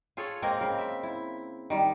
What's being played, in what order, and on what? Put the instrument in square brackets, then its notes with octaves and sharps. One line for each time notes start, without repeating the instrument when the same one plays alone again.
[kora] F4 G#4 A4 C#5
G#3 A#3 C4 A#4
C#3 C4 A#4
E5
E4
D#3 G3